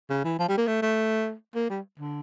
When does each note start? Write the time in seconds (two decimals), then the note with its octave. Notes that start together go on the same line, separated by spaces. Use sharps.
0.10 C#3
0.24 E3
0.39 F3
0.49 G3
0.58 A#3
0.67 A3
0.82 A3
1.55 A#3
1.70 G3
2.00 D3